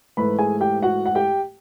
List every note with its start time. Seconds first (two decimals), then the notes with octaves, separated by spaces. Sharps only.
0.17 G#2 E3 A3 B4 B5
0.39 G#4 G#5
0.61 G4 G5
0.82 F#4 F#5
1.06 F#5
1.15 G4 G5